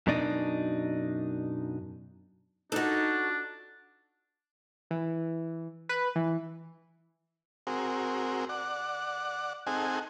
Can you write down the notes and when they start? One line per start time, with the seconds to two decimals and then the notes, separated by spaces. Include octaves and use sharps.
0.07 F#2 B2 D4 D#4
2.72 D4 D#4 F#4 A4
4.91 E3
5.89 B4
6.16 E3
7.67 C4 F#4 G#4 A#4
8.49 D5 F#5
9.67 C4 D#4 G#4 A4 F#5 G#5